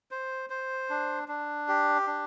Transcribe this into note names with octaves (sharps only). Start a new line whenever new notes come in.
C5
C5
D4
D4
G4
D4